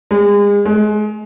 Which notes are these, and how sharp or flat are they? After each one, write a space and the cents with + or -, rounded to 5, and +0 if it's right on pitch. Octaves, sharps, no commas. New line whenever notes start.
G#3 -35
G#3 +30